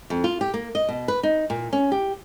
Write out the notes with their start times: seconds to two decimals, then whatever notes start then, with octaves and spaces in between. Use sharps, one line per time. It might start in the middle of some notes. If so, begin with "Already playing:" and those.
0.10 F2
0.24 F4
0.41 G4
0.54 A#3
0.75 D#5
0.88 B2
1.08 B4
1.23 D#4
1.50 A#2
1.73 C#4
1.92 G4